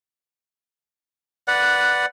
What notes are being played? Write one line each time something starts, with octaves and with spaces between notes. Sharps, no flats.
B4 D5 F#5